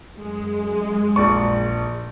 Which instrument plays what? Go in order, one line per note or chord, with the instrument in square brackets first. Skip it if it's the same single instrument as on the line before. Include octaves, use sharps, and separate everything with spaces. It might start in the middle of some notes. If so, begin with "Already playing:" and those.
[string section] F#2 G#3
[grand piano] A#1 D5 C#6